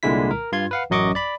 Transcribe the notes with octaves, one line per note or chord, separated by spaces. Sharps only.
C2 A#2 D3 G#3 E4 B6
A#4
G2 F4 C6 G#6
B4 F5 F#5
A1 F#2 F#3 D#5 C#6 D6
D5 B5